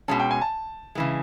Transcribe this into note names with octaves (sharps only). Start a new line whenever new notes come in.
B2 G#3 C#4 A5
G5
G#5
A5
C#3 E3 G#3